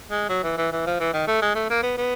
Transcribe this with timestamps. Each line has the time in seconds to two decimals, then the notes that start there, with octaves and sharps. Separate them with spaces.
0.11 G#3
0.29 F#3
0.43 E3
0.58 E3
0.72 E3
0.86 F3
1.00 E3
1.14 D#3
1.27 A3
1.42 G#3
1.55 A3
1.70 A#3
1.83 B3
1.98 B3